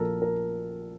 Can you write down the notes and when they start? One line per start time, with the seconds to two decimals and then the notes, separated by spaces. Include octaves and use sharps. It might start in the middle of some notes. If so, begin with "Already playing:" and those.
Already playing: A#1 A#2 F3 A4 A#4
0.22 A#4